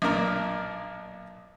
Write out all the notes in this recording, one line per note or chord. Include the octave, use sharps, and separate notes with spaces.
B1 A#2 D4 A#4 A#5